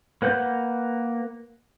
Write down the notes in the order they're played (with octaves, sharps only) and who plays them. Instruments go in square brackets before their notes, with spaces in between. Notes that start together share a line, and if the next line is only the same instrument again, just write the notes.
[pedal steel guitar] A#3 B4 F#5 G6